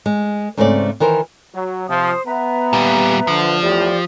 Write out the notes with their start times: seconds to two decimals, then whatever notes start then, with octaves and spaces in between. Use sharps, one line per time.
0.06 G#3
0.57 G#2 C#3 G#3 A3 C4 D5
1.00 D#3 E3 A#4 C5
1.54 F#3
1.88 C3 F3 C5 D#6
2.26 B3 B4 E5 A#5
2.73 A#2 G3
3.27 D3 F3
3.62 E2 A2 G4 D5